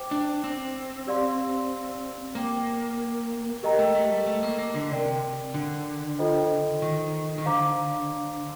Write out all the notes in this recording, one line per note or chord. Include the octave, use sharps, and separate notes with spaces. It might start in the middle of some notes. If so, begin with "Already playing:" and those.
Already playing: C5 G5 D6
D4
C4
G4 D5 F5 C6
A#3 C5 G5 D6
G4 A#4 D#5 G5 A#5
A3
A3
G3
A3
A#3
A#3
D3
C3 A#4 D5 G5
D3
F4 A4 C5 D#5 G5
D#3
D#3
D3 C5 F5 A#5 D6